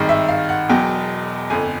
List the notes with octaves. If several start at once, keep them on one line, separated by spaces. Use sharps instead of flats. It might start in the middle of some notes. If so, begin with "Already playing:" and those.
Already playing: G#1 G2 D#3 G#3
E5
F5
F#5
E1 E2 B2 F#3 G5
G1 F2 D3 G#5